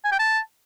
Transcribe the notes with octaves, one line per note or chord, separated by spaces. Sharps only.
G#5
G5
A5